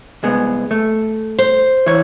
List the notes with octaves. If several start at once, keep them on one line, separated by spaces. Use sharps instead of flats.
C2 G#3 B3
A3
C5
E3 C#5